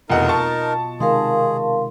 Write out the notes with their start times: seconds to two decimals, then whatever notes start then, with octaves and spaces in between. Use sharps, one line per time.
0.10 F1 E2 B2 D#4 F4 A#4 D#5 F#5
0.29 A5 C#6
1.00 C3 D#3 G#3 G#4 A#4 F5 C6